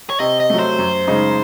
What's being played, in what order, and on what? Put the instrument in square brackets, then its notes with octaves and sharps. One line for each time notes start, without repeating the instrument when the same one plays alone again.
[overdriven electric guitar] C#5
[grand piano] C3 [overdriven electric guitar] D#5
[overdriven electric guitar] D#5
[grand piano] F#3 A3
[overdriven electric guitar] C5
[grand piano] F#2
C#3 G#3 D#4